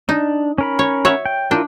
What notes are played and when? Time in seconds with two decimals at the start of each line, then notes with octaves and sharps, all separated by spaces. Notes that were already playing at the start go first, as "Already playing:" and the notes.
0.09 D4 D#4
0.58 C#4 A#4 B5
0.79 C#5
1.05 C#5 E5 F#5
1.26 G5
1.51 D4 E4 F4 A#4 G5